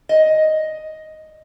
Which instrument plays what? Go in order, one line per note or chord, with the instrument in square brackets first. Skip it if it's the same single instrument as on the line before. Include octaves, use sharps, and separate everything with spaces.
[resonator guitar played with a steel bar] D#5